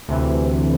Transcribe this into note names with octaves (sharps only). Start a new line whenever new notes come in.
D2 C3 E3